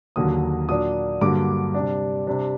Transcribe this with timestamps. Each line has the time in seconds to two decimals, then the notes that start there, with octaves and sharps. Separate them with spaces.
0.16 D#2 D3 F#3 A#3 D#6
0.68 A#2 F#3 A#3 D4 D#6
1.21 G2 D3 F#3 A#3 D6
1.74 C3 G3 D4
2.27 C3 G3 D4